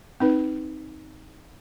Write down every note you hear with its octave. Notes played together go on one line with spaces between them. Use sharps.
C4 D#4 B4